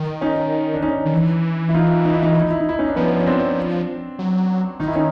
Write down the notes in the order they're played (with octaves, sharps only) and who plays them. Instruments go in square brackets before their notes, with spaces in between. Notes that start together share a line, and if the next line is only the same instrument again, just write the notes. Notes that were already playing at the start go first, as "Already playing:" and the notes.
Already playing: [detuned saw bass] D#3
[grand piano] C#4 D#4
D4
C#4 D#4
[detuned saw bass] D#3
E3
[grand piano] E4
D#4 F4
D#4
E4
D#4
E4
D#4
E4
D#4
E4
C#4 D#4
D4
[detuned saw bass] F3 [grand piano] B3 C#4
[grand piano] C#4
C4 D4
[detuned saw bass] F#3
[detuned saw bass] D#3 [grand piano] D#4
[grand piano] E4
C#4 D#4